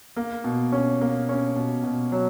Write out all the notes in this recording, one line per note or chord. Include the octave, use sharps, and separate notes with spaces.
A#3
B2
C#4
A#3
C#4
B2
B2
F#3